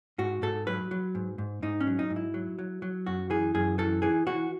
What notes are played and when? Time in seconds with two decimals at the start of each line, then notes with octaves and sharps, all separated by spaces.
0.18 G#2 F#4
0.42 G#2 A4
0.67 F#3 B4
0.91 F#3
1.15 G#2
1.38 G#2
1.62 G#2 D#4
1.80 C#4
1.87 F#3
1.99 D#4
2.10 G#2
2.16 E4
2.34 F#3
2.59 F#3
2.82 F#3
3.06 F#2 F#4
3.30 E3 G#4
3.55 F#2 G#4
3.78 E3 A4
4.02 E3 G#4
4.27 E3 F#4